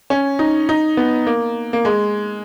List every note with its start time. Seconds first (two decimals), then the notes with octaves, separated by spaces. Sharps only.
0.10 C#4
0.39 D#4
0.69 D#4
0.97 B3
1.27 A#3
1.73 A#3
1.85 G#3